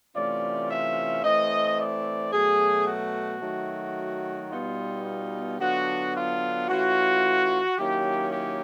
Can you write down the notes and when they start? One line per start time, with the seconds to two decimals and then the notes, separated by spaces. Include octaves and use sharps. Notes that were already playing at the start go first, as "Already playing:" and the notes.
0.15 C3 E3 A3 C#4 F4 D5
0.70 E5
1.23 E3 A3 C4 D#5
1.78 D5
2.32 B2 F#3 A3 G#4
2.88 F#4
3.41 D#3 F#3 A3
4.51 B2 G3 B3 D#4 F4
5.05 F4
5.59 D3 F#3 B3 D4 F4 F#4
6.14 F4
6.68 E3 A3 C#4 F4 F#4
7.77 D#3 F#3 A#3 C#4 E4 G4
8.31 G4